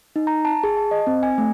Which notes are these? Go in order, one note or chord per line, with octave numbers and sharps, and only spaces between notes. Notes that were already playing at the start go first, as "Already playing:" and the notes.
D#4
A#5
A5
G#4
A5
D#5
C4
G#5
A3